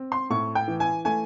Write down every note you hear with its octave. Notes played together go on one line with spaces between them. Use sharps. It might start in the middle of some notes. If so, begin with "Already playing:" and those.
Already playing: C4
C6
A2 C#6
G5
E3
G#5
A3 G#5